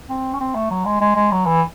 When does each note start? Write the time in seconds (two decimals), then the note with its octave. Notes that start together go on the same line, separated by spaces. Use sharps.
0.09 C4
0.33 C#4
0.40 C4
0.55 A3
0.70 F#3
0.85 G#3
1.01 G#3
1.16 G#3
1.32 F#3
1.46 E3